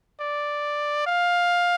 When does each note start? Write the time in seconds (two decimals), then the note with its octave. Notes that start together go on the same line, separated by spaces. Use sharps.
0.20 D5
1.07 F5